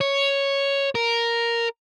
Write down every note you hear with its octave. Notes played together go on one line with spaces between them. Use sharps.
C#5
A#4